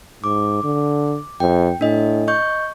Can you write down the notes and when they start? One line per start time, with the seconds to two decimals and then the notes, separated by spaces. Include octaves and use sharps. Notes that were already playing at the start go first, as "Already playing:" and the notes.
0.24 G#2 D6
0.64 D3
1.40 F2 G5
1.81 A2 D4 D#5
2.28 D#5 C#6 G6